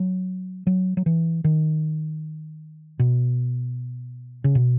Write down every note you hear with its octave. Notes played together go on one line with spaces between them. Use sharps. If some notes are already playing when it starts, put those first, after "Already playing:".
Already playing: F#3
F#3
F#3
E3
D#3
B2
C#3
B2